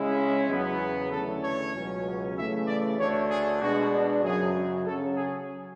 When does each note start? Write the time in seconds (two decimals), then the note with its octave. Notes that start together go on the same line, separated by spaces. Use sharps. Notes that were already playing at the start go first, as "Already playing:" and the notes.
Already playing: C#3 G#3 C#4 E4
0.49 E2 C#3 F#3 B3
1.11 E2 D3 A3 C#4 E4 A4
1.43 C#5
1.74 C#2 B2 F#3 C#4
2.36 C#3 E3 A3 E5
2.66 D5
2.98 D2 D3 A3 D4 C#5
3.29 G#4
3.60 B2 G#3 D4 F#4
4.22 F#2 C#3 F#3 G#4
4.85 C#3 F#3 C#4 A4
5.15 G#4